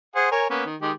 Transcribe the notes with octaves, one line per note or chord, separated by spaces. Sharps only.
G#4 C5 F#5
A#4 C#5 G#5
A#3 B3 C#4
D#3
D#3 G#3 G4